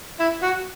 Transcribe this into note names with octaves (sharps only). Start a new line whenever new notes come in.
E4
F#4